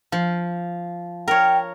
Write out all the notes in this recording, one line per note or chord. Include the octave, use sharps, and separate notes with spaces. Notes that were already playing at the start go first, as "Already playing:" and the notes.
F3
A#4 C#5 G5